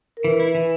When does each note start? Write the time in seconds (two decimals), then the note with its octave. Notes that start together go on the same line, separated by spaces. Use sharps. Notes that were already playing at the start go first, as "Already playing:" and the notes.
0.17 A#4
0.24 E3 B4
0.40 E4
0.55 E3